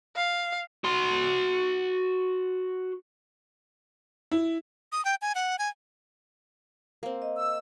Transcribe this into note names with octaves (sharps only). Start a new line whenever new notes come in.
F5
F#4 C6
E4
D#6
G5
G#5
F#5
G#5
A#3 C4
D#5
E6